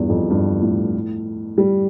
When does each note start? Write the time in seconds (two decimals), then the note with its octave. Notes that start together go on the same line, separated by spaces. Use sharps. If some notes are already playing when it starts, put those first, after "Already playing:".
Already playing: E2 G2
0.09 F2
0.30 G2
0.62 A2
1.58 G3